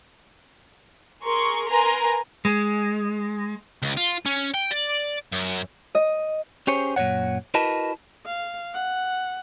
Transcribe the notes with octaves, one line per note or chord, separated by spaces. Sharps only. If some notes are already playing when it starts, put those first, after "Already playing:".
G#4 A#4 C6 C#6
A#4 B4 G#5 A#5 C6
G#3
C#2
F4
C#4
G5
D5
F#2
D#5
C#4 G4 G#4 C5 C#5
F#2 A#2 C#3 C#5 F#5
E4 F#4 A#4 B4 D#5 A5
F5
F#5